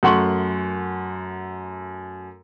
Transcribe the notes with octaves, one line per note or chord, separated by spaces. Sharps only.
F#2 A3 F#5 C6 C#6 F#7